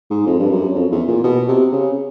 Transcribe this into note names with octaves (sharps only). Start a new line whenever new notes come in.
G#2
F2
G2
F#2
F2
E2
A#2
B2
C3
C#3